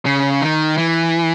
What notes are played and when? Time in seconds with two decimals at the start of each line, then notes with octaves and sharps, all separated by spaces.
0.06 C#3
0.41 D#3
0.77 E3